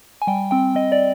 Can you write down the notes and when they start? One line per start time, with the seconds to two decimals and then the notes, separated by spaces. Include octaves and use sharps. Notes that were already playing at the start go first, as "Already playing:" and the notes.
0.22 G#5
0.27 G3 G5
0.51 C4 G5
0.75 C4 D#5
0.92 D5